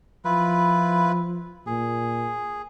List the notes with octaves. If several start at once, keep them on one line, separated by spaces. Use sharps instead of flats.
F3 E4 F4 B4
A#2 G#4